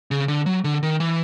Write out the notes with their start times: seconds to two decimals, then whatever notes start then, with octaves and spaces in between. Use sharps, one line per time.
0.11 C#3
0.28 D3
0.46 F#3
0.64 D3
0.83 D#3
1.00 E3